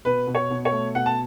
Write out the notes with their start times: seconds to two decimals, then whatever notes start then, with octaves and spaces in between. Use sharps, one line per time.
0.05 B2 B4
0.27 B2
0.35 C#5
0.50 B2
0.65 C#5
0.72 A3
0.95 B2 F#5
1.06 A5